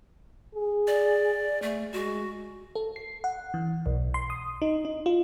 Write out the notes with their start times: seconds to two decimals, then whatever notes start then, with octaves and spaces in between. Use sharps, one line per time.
0.55 G#4
0.87 D5
1.62 A3
1.93 G#3 F#4
2.75 A4
2.96 C7
3.24 F#5
3.54 E3
3.86 B1
4.14 C6
4.30 D#6
4.62 D#4
4.85 D#4
5.06 F4